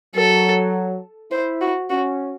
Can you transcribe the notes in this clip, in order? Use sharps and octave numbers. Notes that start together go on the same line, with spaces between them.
F#3 A4
E4 C5
F#4
C#4 F#4